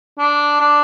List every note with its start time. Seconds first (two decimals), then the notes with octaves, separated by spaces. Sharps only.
0.18 D4
0.60 D4